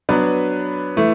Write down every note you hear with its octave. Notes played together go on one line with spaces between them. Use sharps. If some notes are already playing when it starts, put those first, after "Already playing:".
F#3 B3 D4 B4
E3 A3